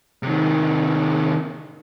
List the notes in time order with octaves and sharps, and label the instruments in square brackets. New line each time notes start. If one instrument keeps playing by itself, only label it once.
[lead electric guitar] C3 D#3